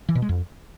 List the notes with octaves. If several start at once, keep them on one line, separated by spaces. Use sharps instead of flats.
E3
B2
G#3
F2